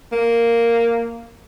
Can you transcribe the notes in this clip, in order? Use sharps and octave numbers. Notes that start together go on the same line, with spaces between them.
A#3